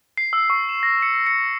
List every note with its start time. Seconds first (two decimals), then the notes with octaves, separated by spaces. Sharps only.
0.18 C7
0.33 E6
0.50 C#6
0.69 E7
0.83 A#6
1.02 C#7
1.27 C#7